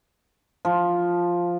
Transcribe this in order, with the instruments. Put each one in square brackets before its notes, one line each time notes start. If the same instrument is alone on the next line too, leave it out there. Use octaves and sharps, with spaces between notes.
[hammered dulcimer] F3